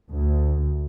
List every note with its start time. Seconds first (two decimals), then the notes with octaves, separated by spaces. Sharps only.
0.11 D2